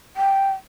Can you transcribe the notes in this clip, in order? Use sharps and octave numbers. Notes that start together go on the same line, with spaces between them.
G5